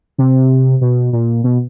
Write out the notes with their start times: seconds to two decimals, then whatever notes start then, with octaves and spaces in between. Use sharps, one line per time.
0.18 C3
0.81 B2
1.13 A#2
1.44 B2